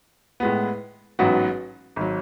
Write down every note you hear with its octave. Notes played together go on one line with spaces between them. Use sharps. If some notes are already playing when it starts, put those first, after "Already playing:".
A2 G#3 B3
A1 G#2 F#3 B3 F#4
G#1 F#3